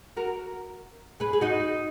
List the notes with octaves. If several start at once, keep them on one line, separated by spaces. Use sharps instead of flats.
F#4 A#4
G#4 B4
G#4
D#4 F#4